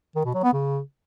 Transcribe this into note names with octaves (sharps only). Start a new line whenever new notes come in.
D#3
B2
F#3
B3
C#3